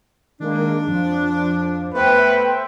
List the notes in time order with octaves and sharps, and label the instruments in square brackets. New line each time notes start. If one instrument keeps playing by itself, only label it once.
[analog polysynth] D#3 G#3 A#3 [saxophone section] D4
[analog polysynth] F2 F3
[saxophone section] A3 B3 [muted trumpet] B4 [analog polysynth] C5 E5 G5